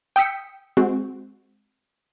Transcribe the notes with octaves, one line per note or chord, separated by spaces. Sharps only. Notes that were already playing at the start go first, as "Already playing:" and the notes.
G5 D#6 E6 B6 C#7
G#3 C4 F#4